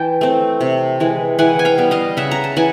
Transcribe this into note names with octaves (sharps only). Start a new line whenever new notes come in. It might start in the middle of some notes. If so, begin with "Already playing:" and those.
Already playing: E3 G5 A5
A3 C4
C3
E3 G#3
E3 F#5 G#5
G#5
F5 G5
G3 B3
D#5 F5
C#3 E5 F#5
A#5
A5
E3 F#5 G#5